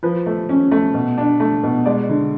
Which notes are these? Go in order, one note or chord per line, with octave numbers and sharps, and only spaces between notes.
F3 B4
A3
C#4
A3
B2
D4
A3
B2
G#3 D5
D3